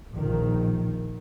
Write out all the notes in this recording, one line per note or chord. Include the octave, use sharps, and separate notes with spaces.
A#1 D#3